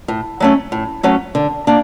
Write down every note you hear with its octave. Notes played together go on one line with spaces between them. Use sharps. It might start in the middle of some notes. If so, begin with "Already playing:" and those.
A2
F#3 A3 C#4
A2
F#3 A3 C#4
D3
A#3 D4